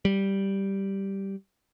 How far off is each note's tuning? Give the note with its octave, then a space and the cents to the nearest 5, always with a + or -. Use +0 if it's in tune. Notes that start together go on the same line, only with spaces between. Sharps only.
G3 -5